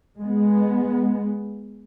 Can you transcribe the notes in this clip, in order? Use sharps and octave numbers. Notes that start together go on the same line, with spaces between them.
G#3 B3